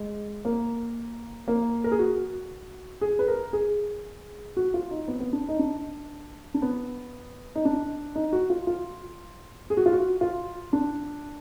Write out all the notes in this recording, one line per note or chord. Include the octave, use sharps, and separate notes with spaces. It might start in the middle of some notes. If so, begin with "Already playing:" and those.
Already playing: G#3
A#3
A#3
A#4
G#4
F#4
G#4
B4
A#4
G#4
F#4
F4
D#4
B3
B3
D4
D#4
D4
D4
B3
D#4
D4
D#4
F#4
F4
F4
G#4
F#4
F4
F#4
F4
D4